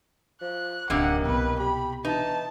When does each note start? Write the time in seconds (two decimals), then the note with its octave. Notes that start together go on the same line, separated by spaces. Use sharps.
0.41 F3 F#6
0.90 D1 F#2 C3 D#3 A#3 D4 F#5
1.25 C2 B2 B4
1.60 G4 B5
2.05 E3 D#4 A5